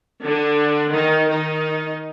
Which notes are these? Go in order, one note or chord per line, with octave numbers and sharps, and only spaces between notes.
D3 D4
D#3 D#4
D#3 D#4